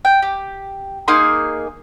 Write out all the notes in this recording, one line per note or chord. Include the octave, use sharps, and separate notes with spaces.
G5
G4
A#3 D#4 G#4 C6